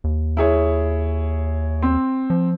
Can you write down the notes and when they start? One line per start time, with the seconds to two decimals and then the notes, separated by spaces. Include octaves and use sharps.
0.04 D#2
0.37 E4 G#4 C#5
1.82 C4
2.30 F3